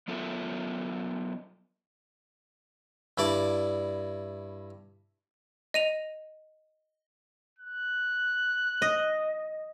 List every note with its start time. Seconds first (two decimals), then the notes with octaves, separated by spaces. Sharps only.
0.08 F#3 B3 F4 A4 A#4 E5
3.18 G2 E4 D5 D6
5.74 D#5 D#7 F7
7.59 F#6
8.82 D#5